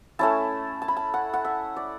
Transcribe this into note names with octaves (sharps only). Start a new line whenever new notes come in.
A3 C#4 E4 A5
A5
B5
A5
F#5
F#5
E5
D5